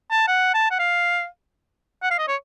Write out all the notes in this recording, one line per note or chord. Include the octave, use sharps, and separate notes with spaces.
A5
F#5
A5
F#5
F5
F#5
F5
D#5
C#5